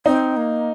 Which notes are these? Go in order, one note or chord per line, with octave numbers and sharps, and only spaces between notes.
C4 D#4
A#3